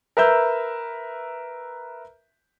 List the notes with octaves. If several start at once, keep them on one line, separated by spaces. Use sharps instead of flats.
A#4 B4 E5 A#5 E6 G6